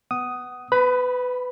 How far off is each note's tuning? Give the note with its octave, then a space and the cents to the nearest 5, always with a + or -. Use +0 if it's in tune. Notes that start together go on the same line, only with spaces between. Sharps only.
B3 +0 F#5 +15 D#6 +0
B4 +20 B5 -15